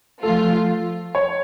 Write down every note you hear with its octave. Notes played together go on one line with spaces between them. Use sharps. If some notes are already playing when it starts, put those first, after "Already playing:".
F3 A3 F4 A4
C#5